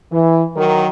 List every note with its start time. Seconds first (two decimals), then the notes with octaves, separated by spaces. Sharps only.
0.12 E3
0.57 D#3 F#3 A#4